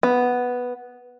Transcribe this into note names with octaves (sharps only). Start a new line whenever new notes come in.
B3